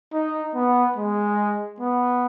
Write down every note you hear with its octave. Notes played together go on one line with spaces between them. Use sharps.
D#4
B3
G#3
B3